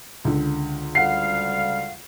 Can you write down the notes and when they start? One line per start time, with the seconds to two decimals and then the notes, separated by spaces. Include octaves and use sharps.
0.25 C#2 D3
0.95 D2 G3 F5 F#5 C7